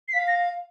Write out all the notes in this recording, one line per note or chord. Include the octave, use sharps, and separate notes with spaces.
C7
F5 B6
A#6